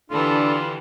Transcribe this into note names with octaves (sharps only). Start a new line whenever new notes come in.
D3 E3 G3 D4 F4 A4